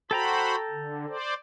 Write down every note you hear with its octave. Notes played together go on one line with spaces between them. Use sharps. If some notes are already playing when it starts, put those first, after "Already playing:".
F#4 A4 C5 G5 A#5 B5
D3
C5 D5